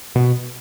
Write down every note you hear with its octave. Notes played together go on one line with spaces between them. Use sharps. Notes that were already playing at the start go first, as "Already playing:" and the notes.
B2